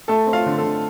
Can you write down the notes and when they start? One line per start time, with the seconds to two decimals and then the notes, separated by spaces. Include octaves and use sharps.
0.08 A3 A4 A5
0.27 C4
0.33 F4 F5
0.46 D3
0.58 A4
0.63 D3